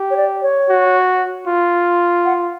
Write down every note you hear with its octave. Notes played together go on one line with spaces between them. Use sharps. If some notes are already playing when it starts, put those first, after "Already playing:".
Already playing: G4
C#5
D5
C#5
F#4
F4
F#5